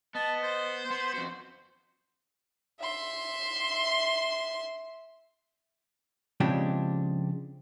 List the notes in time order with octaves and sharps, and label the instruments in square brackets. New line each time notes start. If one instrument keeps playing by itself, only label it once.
[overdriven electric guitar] B3 [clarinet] D#5 [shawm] A5
[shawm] C5
[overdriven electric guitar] B3 [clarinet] C6
[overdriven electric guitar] F2 F#4 [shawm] C5
[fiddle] E5 C6
[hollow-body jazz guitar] C#3 F3 G#3 C4 D4 G4